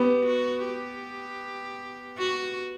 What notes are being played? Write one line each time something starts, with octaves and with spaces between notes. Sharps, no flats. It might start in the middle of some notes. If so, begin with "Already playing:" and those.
Already playing: B3 G4
F#4
G4
F#4